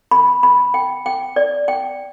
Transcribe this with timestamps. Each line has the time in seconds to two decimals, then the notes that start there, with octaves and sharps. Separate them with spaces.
0.11 B5
0.43 B5
0.74 G5
1.06 G5
1.36 D5
1.68 G5